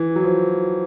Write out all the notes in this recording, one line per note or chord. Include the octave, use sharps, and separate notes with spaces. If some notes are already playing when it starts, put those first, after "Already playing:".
Already playing: E3
F#3
F3